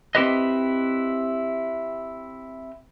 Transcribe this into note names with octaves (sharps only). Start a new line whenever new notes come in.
C4 E4 G4 B4 D#5